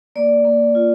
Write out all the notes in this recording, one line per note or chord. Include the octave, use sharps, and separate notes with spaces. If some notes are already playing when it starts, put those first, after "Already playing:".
A#3 D5
A#3
F4